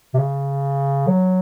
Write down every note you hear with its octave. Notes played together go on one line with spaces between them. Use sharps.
C3
C#3
F#3